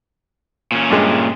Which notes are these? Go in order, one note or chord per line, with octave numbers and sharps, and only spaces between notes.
A#2 C#4
G2 G#3